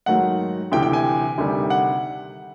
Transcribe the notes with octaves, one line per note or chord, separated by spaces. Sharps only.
G#2 D#3 F#3 A3 F#5
D2 C3 E3 G5
G5
G#5
D2 C3 D#3 G3
F#5